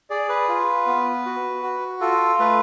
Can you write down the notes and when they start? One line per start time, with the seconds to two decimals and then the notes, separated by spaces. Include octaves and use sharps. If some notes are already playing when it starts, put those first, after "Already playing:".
0.10 G#4 D5
0.29 B4
0.49 F4
0.87 B3
1.25 F#4
1.63 F#4
2.01 F4 A4
2.40 A3 B4